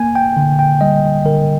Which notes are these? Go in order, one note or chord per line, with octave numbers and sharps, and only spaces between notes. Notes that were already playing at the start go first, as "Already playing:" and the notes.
Already playing: A#3 G#5
G5
D3
G5
G3 D#5
D3 A#4